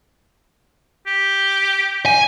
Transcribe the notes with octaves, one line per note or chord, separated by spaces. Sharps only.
G4
G#5